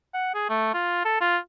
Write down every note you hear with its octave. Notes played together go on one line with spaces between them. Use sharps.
F#5
G#4
A3
F4
A4
F4